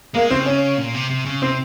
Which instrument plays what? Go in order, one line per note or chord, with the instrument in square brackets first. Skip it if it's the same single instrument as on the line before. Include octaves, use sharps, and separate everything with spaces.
[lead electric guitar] G#3 [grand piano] A#3
[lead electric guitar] C#3 [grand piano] C4
[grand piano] C#4
[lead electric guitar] A#2
C3
C3
C#3
[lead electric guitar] C3 [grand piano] C4